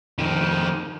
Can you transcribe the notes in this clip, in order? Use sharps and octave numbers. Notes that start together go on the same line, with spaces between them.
F2 D#3